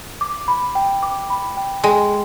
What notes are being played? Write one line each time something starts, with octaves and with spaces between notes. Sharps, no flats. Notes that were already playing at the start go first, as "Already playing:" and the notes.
D6
B5
G5
D6
B5
G5
G#3 G5